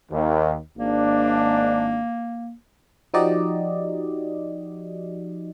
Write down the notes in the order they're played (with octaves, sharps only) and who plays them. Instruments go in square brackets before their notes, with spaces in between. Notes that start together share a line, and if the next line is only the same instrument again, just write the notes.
[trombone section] D#2
[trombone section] G#1 D4 [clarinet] A#3
[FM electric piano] F3 D#4 F#4 G4 D5 D#5